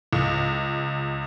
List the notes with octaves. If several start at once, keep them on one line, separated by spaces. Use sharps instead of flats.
C#2